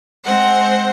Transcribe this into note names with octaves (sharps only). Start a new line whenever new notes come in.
G#3 C4 C5 F#5